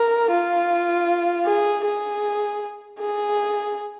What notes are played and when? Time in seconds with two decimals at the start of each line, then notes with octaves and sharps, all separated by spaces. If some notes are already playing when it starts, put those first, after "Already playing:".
Already playing: A#4
0.30 F4
1.46 G#4
1.85 G#4
3.00 G#4